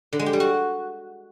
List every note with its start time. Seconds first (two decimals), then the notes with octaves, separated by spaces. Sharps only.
0.13 D3
0.19 G#3
0.26 G4
0.33 G3
0.40 F#4